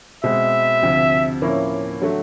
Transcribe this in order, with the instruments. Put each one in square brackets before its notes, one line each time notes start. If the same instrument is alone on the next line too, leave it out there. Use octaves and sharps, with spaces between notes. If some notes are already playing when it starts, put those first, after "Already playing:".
[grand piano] B2 G#3 C4 [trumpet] E5
[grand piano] D2 C3 F3
A2 F3 A#3 C#4 E4
D3 F#3 A3